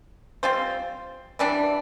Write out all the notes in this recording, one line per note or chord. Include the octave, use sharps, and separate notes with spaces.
G3 C4 F4 C5
E3 G3 D4